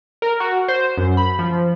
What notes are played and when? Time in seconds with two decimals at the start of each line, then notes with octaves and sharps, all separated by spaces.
0.22 A#4
0.40 F#4
0.68 C5
0.97 F#2
1.17 B5
1.39 F3